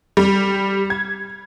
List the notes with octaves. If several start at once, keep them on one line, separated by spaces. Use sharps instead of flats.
G3
G#6